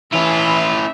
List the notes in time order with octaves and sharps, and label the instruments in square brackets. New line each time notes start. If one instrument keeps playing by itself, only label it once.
[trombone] E3 [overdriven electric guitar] C#4 E4 [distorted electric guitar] F4 [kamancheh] E5